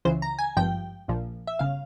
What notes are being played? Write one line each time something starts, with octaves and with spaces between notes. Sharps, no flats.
C#2 C#3 E3 C5
A#5
G#5
G#1 G2 F3 G5
A#1 A#2 F3
E5
G1 C#3 F5